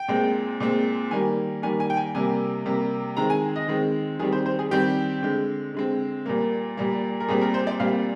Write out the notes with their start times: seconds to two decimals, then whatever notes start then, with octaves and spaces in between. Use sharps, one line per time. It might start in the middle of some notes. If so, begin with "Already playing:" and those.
Already playing: G5
0.08 A#2 G#3 C4
0.60 A#2 G#3 C4
1.11 D#3 G3 A#3 G#5
1.62 D#3 G3 A#3 G#5
1.80 G#5
1.90 G5
1.97 G#5
2.15 C3 G3 A#3 G#5
2.66 C3 G3 A#3
3.17 D#3 G#3 C4 A#5
3.30 G#5
3.56 D#5
3.68 D#3 G#3 C4
4.19 D#3 G#4
4.23 G3 C4
4.32 C5
4.46 C5
4.59 G#4
4.71 D#3 G3 C4 G4
5.23 D3 G#3 C4
5.74 D3 G#3 C4
6.26 A#2 G3 A#3
6.77 A#2 G3 A#3
7.20 A#4
7.29 A#2 G3 C4 G#4
7.42 A#4
7.54 C5
7.67 D5
7.80 A#2 G3 C4 F5